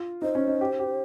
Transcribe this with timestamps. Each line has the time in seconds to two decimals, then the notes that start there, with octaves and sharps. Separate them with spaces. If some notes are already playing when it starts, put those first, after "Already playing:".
Already playing: F4
0.22 D#4 C5
0.35 C#4
0.47 D#4
0.61 G4
0.79 G4